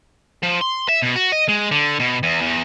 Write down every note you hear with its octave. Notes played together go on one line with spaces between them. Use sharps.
F3
C6
E5
B2
F#4
D#5
G#3
D3
B2
E2
E2